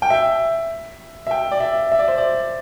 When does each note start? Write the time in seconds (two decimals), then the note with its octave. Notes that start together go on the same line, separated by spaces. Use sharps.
0.02 G5
0.10 E5
1.27 E5
1.31 G5
1.51 D5
1.60 E5
1.92 E5
1.99 D5
2.08 C5
2.18 D5